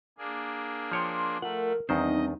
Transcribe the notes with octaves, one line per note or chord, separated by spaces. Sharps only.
A#3 D4 G#4
F3 C#5 G5 C6
A3 F4 A#4 F#5
E2 D#3 G3 C4 D4 D#4 C5 D#5